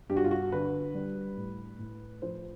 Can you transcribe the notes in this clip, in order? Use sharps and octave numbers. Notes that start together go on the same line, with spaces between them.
G2 G4
F#4
F4
F#4
D3 B4
G3
A2
A2
F3 C5